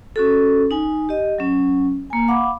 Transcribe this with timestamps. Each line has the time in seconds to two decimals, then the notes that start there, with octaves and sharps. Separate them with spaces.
0.16 C#4 F#4 A4
0.71 D#4 G#5
1.09 G4 D#5
1.38 F#3 C#4
2.10 A#3 G#5
2.28 F5 F#5 B5 D6